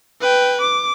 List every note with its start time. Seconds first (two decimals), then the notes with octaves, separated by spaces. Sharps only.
0.21 B4 G5
0.61 D6